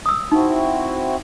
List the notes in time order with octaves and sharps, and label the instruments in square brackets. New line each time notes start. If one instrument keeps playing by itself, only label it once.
[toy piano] D#6 E6
[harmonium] C4 E4 F#4 [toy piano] D#4